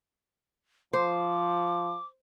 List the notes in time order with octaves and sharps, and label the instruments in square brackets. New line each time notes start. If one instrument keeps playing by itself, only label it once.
[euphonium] F3 [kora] C5 [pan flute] D6